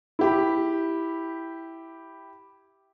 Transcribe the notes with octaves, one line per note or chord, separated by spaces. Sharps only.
E4 G4 B5